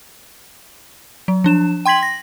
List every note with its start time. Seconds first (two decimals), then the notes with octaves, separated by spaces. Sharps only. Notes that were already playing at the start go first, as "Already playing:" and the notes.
1.28 F#3
1.44 F3 D4 E7
1.85 G5 C6 G#6 B6 F#7
2.03 A#6